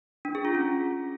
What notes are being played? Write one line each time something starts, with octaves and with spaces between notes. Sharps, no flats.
D4
G#4
F4
C#4